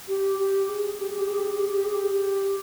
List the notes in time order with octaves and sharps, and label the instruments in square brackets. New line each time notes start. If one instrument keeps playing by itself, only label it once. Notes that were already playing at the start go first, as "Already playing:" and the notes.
[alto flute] G4
G4
G#4
G4
G#4
G4
G#4
G4
G#4
G4
G#4
G4
G#4
G4